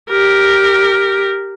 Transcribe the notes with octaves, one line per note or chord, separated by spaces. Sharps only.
G4 A#4